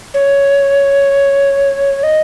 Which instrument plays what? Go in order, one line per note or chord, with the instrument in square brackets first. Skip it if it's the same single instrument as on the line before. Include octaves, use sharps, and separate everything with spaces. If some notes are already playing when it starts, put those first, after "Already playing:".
[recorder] C#5
D#5